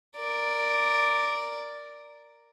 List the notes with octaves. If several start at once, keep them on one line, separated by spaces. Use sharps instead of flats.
A#4 D5